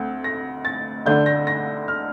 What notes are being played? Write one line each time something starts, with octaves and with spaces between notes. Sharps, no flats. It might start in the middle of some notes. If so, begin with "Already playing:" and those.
Already playing: D2 A3 C4
A#6
A6
D2 D3 A3 D4 G6
A#6
A#6
F6